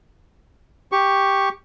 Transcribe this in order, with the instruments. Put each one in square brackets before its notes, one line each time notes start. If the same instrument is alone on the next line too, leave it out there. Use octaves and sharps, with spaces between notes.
[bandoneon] G4 C#6